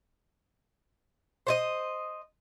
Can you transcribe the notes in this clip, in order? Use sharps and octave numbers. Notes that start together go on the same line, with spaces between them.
C5 C#5 D#5